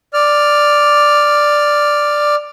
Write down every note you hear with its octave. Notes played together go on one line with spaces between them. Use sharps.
D5 F6